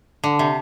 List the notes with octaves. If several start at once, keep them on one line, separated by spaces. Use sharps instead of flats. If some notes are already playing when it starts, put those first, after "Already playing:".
D3
C3